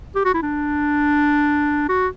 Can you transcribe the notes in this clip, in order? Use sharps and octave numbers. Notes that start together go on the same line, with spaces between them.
G4
F#4
E4
D4
F#4